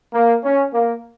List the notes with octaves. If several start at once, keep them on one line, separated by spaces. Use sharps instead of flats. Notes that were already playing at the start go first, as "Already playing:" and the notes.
A#3
C#4
A#3